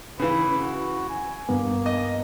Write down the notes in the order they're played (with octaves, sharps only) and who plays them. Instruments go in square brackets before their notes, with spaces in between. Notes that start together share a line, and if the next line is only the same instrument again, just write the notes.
[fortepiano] C#3 E3 [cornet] B4
[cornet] F#4
G#5
[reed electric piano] G2 B3 [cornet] A#3
[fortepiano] D#5